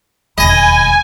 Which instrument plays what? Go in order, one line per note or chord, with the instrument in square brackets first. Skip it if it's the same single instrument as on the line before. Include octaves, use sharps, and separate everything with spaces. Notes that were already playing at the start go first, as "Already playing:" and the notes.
[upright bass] E1 D#2 [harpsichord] D#5 [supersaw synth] G#5 [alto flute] B5